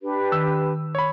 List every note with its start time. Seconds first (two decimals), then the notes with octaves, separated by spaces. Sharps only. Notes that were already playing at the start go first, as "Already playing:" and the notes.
0.01 D4 G4 B4
0.32 D#3 E6
0.95 C#5 B5